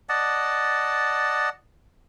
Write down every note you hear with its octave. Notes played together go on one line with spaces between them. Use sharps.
D5 D#5 F#5 A5